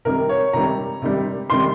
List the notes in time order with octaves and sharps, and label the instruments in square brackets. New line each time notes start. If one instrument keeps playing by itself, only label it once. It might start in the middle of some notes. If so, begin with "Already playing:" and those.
[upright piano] C3 D#3 G3 A#4
C#5
C3 D#3 G3 A#5
C3 D#3 G3
C3 D#3 G3 C6